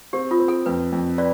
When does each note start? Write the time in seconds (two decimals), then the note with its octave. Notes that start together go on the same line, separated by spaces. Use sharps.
0.13 C4 G4
0.31 F4
0.39 C4
0.48 A4
0.66 F2 B4
0.92 F2
1.18 B4 D5